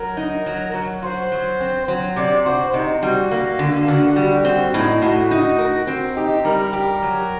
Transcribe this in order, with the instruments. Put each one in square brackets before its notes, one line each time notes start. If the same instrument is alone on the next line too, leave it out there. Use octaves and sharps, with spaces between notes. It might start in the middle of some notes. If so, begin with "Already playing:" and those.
Already playing: [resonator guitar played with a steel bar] F#3 [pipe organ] A#4
[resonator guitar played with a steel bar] D#4
F#3
F#3
[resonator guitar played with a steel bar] F#4 [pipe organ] C5
[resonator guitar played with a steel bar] F#3
C4
F#3
[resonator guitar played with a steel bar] C3 [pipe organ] D5
[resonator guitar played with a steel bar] F#4 [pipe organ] C5
[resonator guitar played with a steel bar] C3 [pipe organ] D#4
[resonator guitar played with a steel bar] G3 [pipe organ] F#4
[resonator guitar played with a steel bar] A#3
D3
[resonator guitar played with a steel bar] D3 [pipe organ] F#4
[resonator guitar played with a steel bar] G3 [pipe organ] F#4
[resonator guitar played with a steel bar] C4 [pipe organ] F#4
[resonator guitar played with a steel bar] A2 [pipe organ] D#4
[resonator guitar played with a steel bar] A2 [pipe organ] F#4
[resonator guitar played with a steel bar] D#4
A#4
C4
[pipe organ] D#4 [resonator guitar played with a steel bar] G4
[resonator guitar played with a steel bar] G3 [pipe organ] A#4
[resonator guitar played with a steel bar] G4
F#3